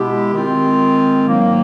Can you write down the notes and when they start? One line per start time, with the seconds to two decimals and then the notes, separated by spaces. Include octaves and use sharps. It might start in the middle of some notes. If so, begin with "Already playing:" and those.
Already playing: B2 G#3 B3 E4 G4
0.32 D#3 G#3 C4 F4
1.28 G#2 D#3 F#3 A#3